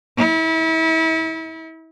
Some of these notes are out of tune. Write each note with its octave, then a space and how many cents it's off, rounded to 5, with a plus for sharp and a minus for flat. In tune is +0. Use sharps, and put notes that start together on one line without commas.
E4 -35